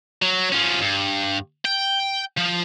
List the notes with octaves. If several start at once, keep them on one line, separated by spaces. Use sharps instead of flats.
F#3
F3 C#4
G2
G5
F3